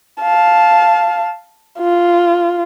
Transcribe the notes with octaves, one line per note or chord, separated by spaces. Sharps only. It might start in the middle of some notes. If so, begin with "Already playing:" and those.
F5 A5
F4